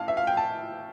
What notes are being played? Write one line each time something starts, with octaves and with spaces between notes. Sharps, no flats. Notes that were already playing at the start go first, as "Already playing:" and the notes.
Already playing: A1 A2 F5 A5
E5
F5
G5
A5